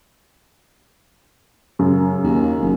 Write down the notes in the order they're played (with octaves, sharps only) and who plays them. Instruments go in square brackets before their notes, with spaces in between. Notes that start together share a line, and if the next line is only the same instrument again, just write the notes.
[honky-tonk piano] F#2 C#3
[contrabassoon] D#2
F#1